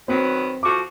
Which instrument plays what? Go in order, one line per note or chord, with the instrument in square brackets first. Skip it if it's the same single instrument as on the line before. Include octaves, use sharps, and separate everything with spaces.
[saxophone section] D#3 F#3 B3 [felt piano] C4
[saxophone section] F3 F#4 A4 [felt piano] D6